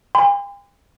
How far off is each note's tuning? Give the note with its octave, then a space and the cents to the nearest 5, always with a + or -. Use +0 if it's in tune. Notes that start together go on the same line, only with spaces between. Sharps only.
G5 +45 C6 -40